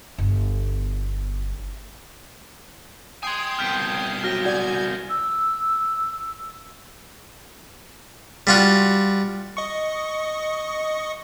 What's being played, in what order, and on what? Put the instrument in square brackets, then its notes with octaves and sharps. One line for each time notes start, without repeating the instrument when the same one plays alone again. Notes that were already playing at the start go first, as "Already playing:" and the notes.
[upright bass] G1 B3
[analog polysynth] G5 C7 D#7 [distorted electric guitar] G#5 C6 [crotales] D#6 G#6
[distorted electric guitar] C2 B2 [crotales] F6 G6 B6
[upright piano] F#3 [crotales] F6 A#6 G7
[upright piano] F#4 D5 [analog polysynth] G#5 G6 G#6
[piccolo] E6
[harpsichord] G3 F4 F#4
[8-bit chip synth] D#5 C#6